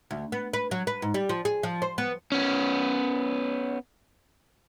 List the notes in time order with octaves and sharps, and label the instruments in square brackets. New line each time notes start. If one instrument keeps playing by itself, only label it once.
[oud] D2
B3
B4
F#3
B4
G#2
G3
F3
G#4
F3
C5
B3
[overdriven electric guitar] B3 C#4